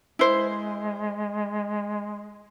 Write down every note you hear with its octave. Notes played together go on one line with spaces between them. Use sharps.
G#3 E4 C5